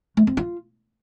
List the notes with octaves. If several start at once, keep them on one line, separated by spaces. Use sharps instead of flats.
A3
C4
F4